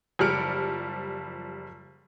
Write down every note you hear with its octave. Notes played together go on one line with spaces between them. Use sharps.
F#1 F3 G3 F6 C#7 D7